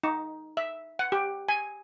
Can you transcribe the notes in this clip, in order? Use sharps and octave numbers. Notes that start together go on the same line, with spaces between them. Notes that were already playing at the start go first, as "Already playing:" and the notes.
D#4
E5
F#5
G4
G#5